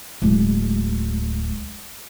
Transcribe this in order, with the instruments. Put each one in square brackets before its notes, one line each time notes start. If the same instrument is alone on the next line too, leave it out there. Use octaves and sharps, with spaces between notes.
[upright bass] D1 G#3